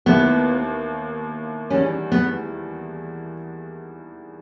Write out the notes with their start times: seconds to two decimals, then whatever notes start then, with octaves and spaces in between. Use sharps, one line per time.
0.06 D#2 D#3 A#3 B3 E4
1.70 E2 D#3 G3 C#4
2.12 B3